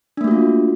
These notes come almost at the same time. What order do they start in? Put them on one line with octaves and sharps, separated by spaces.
D4 A#3 A3 F#4 F4